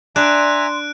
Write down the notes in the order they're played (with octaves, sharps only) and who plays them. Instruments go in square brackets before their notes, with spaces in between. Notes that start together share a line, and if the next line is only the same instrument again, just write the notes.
[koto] D4 [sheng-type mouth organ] E5 G#5 A#5 [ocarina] C6 [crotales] F#6 D7